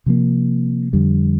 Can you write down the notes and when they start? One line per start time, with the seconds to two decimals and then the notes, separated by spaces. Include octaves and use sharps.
0.06 C3 F3 A#3
0.93 F2 D3 G3